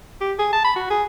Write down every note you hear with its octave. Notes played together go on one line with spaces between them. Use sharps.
G4
G#4
A5
B5
F#4
G#4